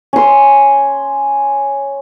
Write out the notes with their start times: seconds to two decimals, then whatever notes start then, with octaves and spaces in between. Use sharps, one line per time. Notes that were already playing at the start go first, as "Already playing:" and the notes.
0.13 C#4 C6